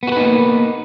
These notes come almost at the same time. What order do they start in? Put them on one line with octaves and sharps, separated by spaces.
B3 F#4 B4 D#4 A#3